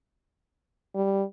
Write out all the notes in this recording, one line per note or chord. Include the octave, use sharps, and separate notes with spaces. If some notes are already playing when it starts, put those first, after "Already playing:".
G3